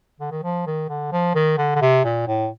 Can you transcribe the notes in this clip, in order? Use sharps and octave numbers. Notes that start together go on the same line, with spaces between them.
D3
D#3
F3
D#3
D3
F3
D#3
D3
D3
C3
A#2
A2